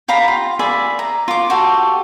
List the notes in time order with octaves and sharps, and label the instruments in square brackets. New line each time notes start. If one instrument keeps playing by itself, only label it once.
[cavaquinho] G4 F5 A#5 B5
F4
G#4 D5 E5 B5
A#5
F4 D6
F#4 G4 A4